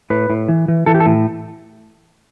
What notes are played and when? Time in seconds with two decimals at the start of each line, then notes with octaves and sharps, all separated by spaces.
0.10 A2 B4
0.30 A2
0.48 E3
0.68 E3
0.86 E3 A4
0.94 G4
1.00 A4
1.06 A2